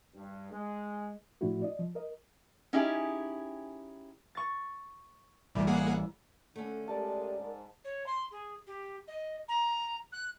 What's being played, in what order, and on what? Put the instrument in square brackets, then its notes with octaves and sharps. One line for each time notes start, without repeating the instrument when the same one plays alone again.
[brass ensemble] G2
G#3
[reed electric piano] A2 F3 A3 D4 E4 F#4
D5 D#5
F3
A#4 D#5
[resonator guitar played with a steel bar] C#4 D#4 E4 G4 G#4
[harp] C#6 A6
[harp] A1 G3 [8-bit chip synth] D2 A2
[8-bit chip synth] A#3 G#4 F#5
[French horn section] D3 [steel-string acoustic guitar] A3 C#4
[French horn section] D2 G#3 G4 [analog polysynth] A#4 D5 [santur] A5
[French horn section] G#2
[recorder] C#5
C6
G#4
G4
D#5
A#5
F#6